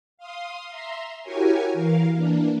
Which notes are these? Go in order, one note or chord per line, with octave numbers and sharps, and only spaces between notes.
F5 C6 D#6
E5 A#5 C6
E4 F#4 G4 A#4 C#5 G#5
E3 A#4 F5
E3 A#3 D4